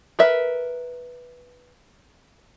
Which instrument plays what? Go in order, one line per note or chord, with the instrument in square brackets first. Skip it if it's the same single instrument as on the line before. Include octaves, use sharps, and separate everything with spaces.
[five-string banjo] A#4 B4 E5